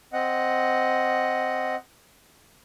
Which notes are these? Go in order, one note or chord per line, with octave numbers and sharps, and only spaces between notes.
C4 D#5 F#5